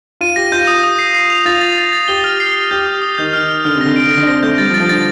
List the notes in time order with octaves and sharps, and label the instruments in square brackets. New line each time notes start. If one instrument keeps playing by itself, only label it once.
[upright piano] F4 [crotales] D#7
[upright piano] G4 [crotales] A#6
[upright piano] F4 [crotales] G6
[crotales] D#6
D#6
C7
C7
F7
[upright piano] F4 [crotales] A6
[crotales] A6
A6
A6
[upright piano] G4 [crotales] G7
[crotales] F6
C7
C7
[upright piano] G4 [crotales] G6
[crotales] D#6
D#6
[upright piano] D#3 [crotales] G6
[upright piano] D#3 [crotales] F6
[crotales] F6
[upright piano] D3 [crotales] F6
[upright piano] C3
[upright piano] D3 [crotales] A#6
[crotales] D7
[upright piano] D3
[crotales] A#6
[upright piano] D3
D4
[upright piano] C4 [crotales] A#6
[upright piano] A3 [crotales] G6
[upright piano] G3 [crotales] A6
[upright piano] F3
[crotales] A6
[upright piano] F3
[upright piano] D3 [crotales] A6